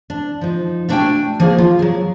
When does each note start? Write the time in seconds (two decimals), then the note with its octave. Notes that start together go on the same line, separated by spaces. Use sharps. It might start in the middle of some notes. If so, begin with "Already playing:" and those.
0.10 D4
0.41 F3 D#4
0.89 A3 B3 D4 F#4 G5 G#5
1.40 F3 A#3 B3 D#4 G#4
1.58 F4
1.79 F#3 G#4